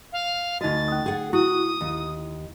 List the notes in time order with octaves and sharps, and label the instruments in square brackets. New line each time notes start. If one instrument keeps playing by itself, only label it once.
[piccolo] F5
[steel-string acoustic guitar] D2 D#5 [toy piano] D#4 F#4 [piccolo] A6
[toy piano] C#4 D#6
[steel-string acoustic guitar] G#4 F#5
[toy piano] E4 [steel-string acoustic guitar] F#4 [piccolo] D#6
[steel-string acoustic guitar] D#2